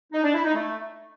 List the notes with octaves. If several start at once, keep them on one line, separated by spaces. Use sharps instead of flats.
D#4
D4
E4
D#4
A3